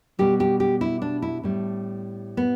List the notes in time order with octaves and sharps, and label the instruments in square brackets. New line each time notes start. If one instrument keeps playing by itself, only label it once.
[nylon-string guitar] B2 G3 G4
G4
G4
E4
D4
E4
A2 G3
B3